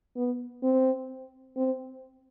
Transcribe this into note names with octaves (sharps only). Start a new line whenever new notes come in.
B3
C4
C4